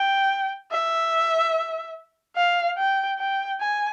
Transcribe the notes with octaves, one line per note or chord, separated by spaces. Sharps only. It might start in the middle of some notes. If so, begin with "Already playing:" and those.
Already playing: G5
E5
F5
G5
G5
G#5